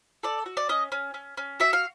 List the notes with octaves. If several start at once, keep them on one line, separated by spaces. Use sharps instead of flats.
A4 D5
F#4
D5
C#4 D#5
C#4
C#4
C#4
F#4 E5
F5